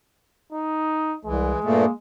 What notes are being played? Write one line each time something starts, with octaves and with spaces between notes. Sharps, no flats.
D#4
C2 E3 G#3
G2 A#2 A3 A#3